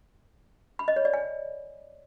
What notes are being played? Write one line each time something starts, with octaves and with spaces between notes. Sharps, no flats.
B5
D#5
C#5
D5
G#5